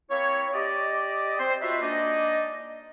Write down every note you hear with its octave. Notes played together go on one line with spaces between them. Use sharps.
A#3 C4 E4 C#5
G4 D5 D#5
C4 C5
D#4 F4 F#4 B4 C5 E5
G#3 A#3 D4 D#4 D5 D#5